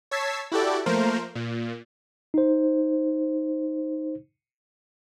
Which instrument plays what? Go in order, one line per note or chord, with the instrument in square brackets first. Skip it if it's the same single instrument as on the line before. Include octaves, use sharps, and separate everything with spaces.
[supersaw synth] C#5 A5 E6 G#6 B6 C7
E4 F#4 G4 A4 D5
F3 A3 A#3 A#4 C5
A#2
[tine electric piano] D#4 C5